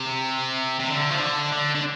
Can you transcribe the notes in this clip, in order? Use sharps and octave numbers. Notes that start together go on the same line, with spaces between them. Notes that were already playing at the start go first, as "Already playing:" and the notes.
Already playing: C3
C3
D3
F3
D3
D3
D3